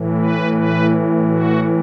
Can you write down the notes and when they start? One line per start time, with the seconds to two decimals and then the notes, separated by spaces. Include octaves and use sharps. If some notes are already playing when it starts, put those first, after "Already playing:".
Already playing: A2 E3
0.17 B4
0.54 B4
1.27 F#4